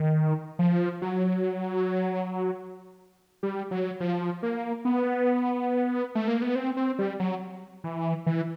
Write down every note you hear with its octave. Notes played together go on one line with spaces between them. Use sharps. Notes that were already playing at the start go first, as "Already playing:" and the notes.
Already playing: D#3
F3
F#3
G3
F#3
F3
A#3
B3
A3
A#3
B3
C4
C4
G3
F#3
E3
E3